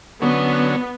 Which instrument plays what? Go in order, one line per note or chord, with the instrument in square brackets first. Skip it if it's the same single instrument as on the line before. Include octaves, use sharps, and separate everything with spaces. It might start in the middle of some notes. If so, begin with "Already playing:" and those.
[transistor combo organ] D3 F#3 C#4 [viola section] B3